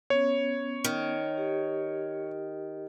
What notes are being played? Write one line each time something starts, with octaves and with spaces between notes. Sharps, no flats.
B3 C#4 C#5
D#3
G4